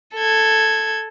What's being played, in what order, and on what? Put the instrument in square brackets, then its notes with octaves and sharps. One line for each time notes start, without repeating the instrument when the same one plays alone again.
[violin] A4 G#6